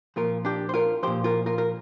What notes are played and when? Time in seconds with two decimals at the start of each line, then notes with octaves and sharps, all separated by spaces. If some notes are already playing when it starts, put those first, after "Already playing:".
0.16 A#2 F3 F4 A#4
0.45 D4 G4
0.69 C5
0.74 F4 A#4
1.03 A#2 F3 G4 C5
1.24 F4 A#4
1.46 F4 A#4
1.58 A#4